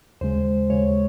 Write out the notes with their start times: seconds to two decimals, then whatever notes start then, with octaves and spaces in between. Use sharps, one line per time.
0.21 D#2 C#3 G#3 C5
0.70 D#2 C#3 G#3 C#5